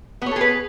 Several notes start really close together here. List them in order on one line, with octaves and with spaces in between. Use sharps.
B3 C#5 A4 G#4 B4